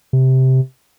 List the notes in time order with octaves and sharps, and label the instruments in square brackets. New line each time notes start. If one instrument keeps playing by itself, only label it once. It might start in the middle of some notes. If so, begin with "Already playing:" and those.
[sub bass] C3